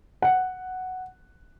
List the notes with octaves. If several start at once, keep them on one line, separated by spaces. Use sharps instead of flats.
F#5